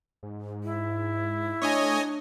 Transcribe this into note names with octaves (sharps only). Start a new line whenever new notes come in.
G#2
E4
A3 D4 C#5 D#5 G#5